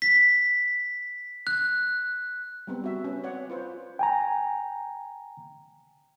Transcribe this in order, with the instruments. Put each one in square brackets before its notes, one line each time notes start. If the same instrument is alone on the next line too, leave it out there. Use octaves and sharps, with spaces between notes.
[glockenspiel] B6
F#6
[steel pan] G3 B3 C4 B4
F#4 E5
C#4 B4
C4 C#5 D5 F#5
F4 B4 C5
[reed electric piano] G5 G#5 A#5